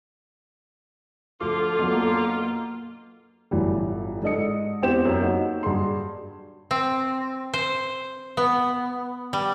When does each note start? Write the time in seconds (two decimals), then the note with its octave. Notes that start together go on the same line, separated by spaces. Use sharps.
1.41 D2 D3 F3 F4 A4 D6
1.79 F#2 B2
1.91 A#3
3.51 G1 A2 E3 F#3 G3
4.22 G#2 D4 A4 D#5 D#6 C#7
4.82 E2 C4 G4 C5 G6 E7
5.05 F#2
5.20 F#3 A#3 D#4 F#4 F#5
5.63 G2 F#4 G#4 C6
6.71 C4
7.54 C5
8.37 B3
9.33 G3